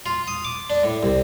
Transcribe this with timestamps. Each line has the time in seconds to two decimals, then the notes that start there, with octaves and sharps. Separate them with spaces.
0.06 F4
0.28 D#6
0.45 D6
0.70 D4
0.83 A2
1.03 C2